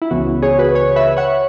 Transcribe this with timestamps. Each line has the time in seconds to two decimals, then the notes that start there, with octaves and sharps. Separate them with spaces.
0.02 E4
0.11 C#2 C#3 E3 B3 F#4
0.42 G#4 C#5
0.58 F#4 B4
0.75 G#4 C#5
0.96 B4 E5
1.17 C#5 F#5